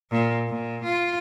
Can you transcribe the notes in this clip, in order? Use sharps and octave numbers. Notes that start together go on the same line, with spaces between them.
A#2
A#2
F4